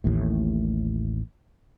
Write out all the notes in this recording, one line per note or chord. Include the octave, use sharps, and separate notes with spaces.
A1 D#2 A2